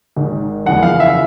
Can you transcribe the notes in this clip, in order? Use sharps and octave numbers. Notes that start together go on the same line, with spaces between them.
G#1 G#2 D#3
F#1 E2 C#3 F3 F#5
F5
E5